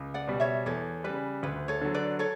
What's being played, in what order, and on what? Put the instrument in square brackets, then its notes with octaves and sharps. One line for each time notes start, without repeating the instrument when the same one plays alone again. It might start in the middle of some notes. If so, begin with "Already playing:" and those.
Already playing: [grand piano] C#2
[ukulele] D5 F#5
[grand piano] B2 G3
[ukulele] C#5 E5
[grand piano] E2 [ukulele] A4 C#5
[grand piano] C#3 G3 [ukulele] B4
[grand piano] D2 [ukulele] B4
[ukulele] A4 C#5
[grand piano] D3 F#3
[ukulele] B4 D5
A4 C#5